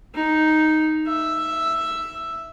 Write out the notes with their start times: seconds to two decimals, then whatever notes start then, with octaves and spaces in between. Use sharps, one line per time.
0.15 D#4
1.08 E5